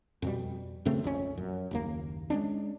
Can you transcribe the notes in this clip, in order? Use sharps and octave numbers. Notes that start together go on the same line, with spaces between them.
F2 B2 G3
F#2 C#3 A3 C4
A#1 F2 F3 C#4
F#2
F#1 D#2 A#3
G#3 C#4 D4